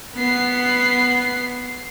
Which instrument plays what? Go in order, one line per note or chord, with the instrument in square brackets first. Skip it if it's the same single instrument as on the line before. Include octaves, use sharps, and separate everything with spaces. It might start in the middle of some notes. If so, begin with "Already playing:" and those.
[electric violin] B3 C7